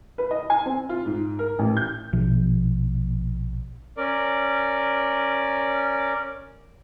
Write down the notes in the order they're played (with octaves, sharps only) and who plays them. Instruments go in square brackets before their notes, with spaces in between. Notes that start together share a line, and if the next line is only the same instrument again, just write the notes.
[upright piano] B4
D#5
G#5
C4
F4
G#2
A#4
A1
G6
[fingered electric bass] A#1 B2 F3
[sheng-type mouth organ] C#4 A#4 D5